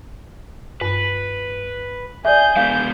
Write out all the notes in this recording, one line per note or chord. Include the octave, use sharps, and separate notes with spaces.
G2 B4
G#4 D5 E5 G6
G#3 B3 D4 F5 G6